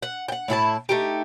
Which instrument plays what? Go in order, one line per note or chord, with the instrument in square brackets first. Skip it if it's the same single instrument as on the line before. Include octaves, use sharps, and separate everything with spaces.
[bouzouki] F#5
F#5 G5
A2 E4 G#4 A5
A3 D#4 G4